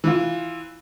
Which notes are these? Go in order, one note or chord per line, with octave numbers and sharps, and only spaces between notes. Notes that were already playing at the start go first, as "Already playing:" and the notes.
E3 F4